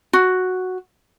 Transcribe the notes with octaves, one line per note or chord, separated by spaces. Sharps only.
F#4